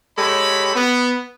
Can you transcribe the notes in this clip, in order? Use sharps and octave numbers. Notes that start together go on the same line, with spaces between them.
G#3 G4 A4 C#5 B5
B3